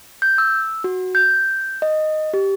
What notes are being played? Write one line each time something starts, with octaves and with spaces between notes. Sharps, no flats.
G6
E6
F#4
G6
D#5
G4